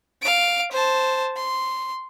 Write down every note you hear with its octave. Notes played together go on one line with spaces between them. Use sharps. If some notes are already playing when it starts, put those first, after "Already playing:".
F5 D7
C5 A5
C6